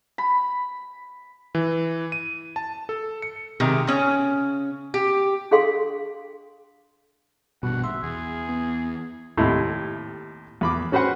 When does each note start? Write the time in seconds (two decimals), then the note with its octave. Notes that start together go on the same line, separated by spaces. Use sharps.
0.18 B5
1.55 E3
2.12 D#7
2.56 A5
2.89 A4
3.22 C#7
3.60 C3 D#3 G#3 G4
3.87 C#3 C#4
4.94 G4
5.51 D4 G#4 A4 F5 G5 C6
7.63 A#1 G2 B2 F#5
7.84 E5 C6
8.03 E2 G#4
8.49 B3
9.37 D#2 A2 C3 E4
10.61 E2 B5 D6
10.92 C#4 F#4 B4 C5 F#5